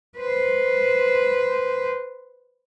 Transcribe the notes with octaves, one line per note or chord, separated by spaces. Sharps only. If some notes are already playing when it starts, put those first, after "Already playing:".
B4 C5